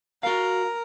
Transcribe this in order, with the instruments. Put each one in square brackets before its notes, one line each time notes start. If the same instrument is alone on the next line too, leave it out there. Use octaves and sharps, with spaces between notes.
[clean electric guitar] F#4 F5 [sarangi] A#4